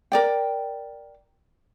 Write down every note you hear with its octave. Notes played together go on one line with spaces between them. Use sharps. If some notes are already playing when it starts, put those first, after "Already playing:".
A#4 D5 G5